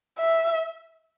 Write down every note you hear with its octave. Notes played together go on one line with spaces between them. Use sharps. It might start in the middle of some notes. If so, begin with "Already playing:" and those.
E5